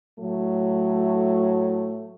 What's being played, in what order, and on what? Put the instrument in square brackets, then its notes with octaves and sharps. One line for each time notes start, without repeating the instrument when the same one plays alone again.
[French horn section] A2 F#3 A3